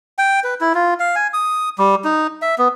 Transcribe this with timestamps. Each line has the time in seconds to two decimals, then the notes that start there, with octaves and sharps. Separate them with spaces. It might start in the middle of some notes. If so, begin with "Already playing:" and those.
0.18 G5
0.44 B4
0.61 E4
0.74 F4
1.00 F5
1.16 G#5
1.34 D#6
1.78 G3
2.04 D#4
2.42 E5
2.58 B3